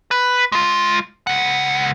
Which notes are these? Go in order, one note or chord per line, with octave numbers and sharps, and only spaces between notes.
B4
G#3 F4
C#2 F#5